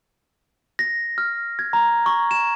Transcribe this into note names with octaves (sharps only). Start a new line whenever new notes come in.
A#6
F6
G#6
A#5
C#6
E7